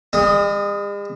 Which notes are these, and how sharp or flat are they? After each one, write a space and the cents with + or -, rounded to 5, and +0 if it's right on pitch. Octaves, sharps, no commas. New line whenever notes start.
G#3 -45 D#6 +0